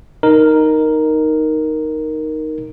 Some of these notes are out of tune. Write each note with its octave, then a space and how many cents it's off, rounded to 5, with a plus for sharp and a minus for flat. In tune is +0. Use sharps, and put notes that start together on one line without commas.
D#4 -5 A#4 +0